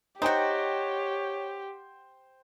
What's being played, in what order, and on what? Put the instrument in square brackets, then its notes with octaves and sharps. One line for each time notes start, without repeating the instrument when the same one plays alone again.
[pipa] D#4 F#4 [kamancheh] G4 [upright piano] C5 G5 [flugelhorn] C#5